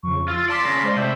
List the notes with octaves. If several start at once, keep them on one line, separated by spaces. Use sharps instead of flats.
F2 C#3 C#6
F4 E6 A6
D5 A5 C6 D6 B6
D#2 C#3 A#6
G#3 C5 D5
A2 C3 E5 G6